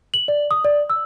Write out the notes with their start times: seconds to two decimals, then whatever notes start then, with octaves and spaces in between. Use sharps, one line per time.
0.14 F#7
0.28 D5
0.51 D#6
0.65 D5
0.90 E6